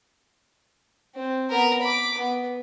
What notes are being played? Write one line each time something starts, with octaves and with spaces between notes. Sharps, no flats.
C4
B3 A#4
B5 D6
B3